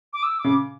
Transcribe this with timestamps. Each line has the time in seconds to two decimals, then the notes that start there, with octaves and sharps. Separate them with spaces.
0.13 D6
0.23 E6
0.39 D6
0.44 C#3